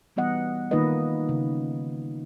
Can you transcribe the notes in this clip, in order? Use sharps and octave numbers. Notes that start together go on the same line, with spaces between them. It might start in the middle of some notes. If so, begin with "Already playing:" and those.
E3 G3 B3 D#5 F#5
D#3 A#3 D#4 F4 B4 D#5
C#3